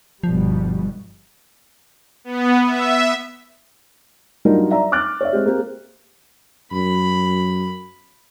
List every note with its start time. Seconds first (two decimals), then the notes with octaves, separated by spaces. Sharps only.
0.24 G1 B2 F3 G3
2.24 B3
2.66 E5
4.45 F#3 G3 D4 D#4 F4 A#4
4.71 D5 E5 A#5
4.92 D6 F6 F#6 A6
5.21 C#5 D5 E5
5.33 G#3 C4 G4
5.46 A#3 C4 G4 G#4
6.72 F#2 B5